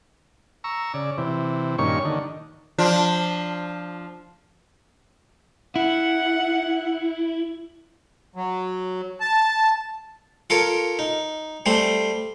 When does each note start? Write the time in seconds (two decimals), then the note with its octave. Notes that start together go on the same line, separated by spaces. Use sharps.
0.64 A#5 C#6 E6
0.94 C#3 D5
1.18 C3 E3
1.78 G2 A#2 D#3 C#4 C#5 C#6
2.05 D3 D#3
2.78 F3 D4 F4
5.76 E4 F#5
8.36 F#3
9.20 A5
10.50 F4 A4 A#4 C#5
10.99 D#4
11.66 G3 A3 C4 C6